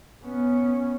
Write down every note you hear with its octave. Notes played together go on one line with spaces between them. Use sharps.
B3 C#4